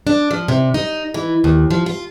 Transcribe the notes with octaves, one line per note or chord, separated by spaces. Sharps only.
D4
F3
C3
D#4
E3
D#2
F3
F4